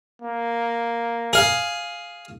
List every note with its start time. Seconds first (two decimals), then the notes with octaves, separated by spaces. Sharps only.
0.22 A#3
1.33 G#4 F5